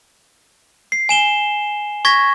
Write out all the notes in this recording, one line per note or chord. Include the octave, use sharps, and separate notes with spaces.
C7
G#5 E7 G7
C#6 G#6 A#6 B6